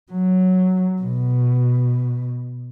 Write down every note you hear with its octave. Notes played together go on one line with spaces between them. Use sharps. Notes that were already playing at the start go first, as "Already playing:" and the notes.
F#3
B2